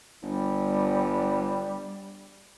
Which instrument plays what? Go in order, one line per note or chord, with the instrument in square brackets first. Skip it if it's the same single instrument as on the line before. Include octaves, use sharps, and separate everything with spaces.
[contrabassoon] G1 [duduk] G3